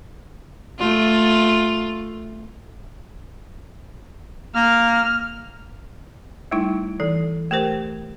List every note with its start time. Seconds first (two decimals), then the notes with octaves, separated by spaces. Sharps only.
0.79 A3 F4
4.55 A#3 F6
6.51 G3 A3 D#4 E4
7.00 E3 A4
7.51 A3 G4 A#4 C5